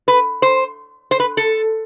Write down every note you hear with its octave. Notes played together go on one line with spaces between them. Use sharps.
B4
C5
C5
B4
A4